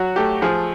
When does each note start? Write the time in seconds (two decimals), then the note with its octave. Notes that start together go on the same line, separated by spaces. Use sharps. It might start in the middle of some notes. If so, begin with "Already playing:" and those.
Already playing: F#3 F#4
0.16 A3 G4
0.42 F3 G#4